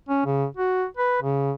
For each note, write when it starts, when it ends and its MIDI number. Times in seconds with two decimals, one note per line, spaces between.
0.09 0.23 61
0.26 0.46 49
0.57 0.86 66
0.97 1.18 71
1.22 1.52 49